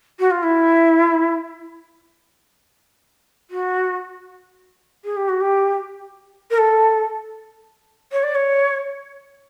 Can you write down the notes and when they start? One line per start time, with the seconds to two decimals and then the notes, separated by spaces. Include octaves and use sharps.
0.19 F#4
0.30 F4
0.43 E4
3.50 F#4
5.04 G#4
5.16 G4
5.28 F#4
5.40 G4
6.50 A#4
6.57 A4
8.12 C#5
8.23 D5
8.35 C#5